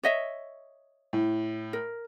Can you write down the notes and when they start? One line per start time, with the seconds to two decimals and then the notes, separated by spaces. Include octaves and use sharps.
0.03 C#5 D#5 E5
1.13 A2
1.73 A#4